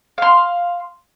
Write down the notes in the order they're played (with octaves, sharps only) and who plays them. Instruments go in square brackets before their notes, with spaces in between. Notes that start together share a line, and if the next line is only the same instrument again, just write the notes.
[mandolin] F5 C6